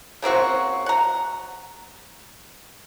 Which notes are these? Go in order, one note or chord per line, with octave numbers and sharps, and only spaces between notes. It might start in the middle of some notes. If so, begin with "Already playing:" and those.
C#3 A#3 C4 F#4
F#5 A#5